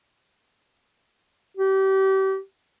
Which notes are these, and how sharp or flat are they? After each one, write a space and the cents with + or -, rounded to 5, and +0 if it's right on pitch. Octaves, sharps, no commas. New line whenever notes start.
G4 -30